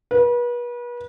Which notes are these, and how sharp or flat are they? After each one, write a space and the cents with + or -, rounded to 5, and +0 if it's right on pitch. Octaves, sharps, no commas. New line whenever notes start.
B4 -35